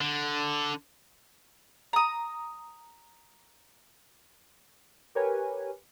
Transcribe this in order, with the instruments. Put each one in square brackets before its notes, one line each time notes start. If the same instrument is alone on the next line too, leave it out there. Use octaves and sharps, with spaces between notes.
[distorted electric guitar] D3
[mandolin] A#5 D#6
[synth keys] G4 A#4 B4 C#5 G#5